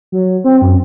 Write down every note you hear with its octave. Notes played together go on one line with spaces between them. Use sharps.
F#3
C4
F#2